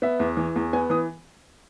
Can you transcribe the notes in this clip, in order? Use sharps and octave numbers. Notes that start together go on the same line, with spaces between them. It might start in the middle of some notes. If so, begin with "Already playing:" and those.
B3 E5
E2
E3
E2
B3 G#5
E3 D#6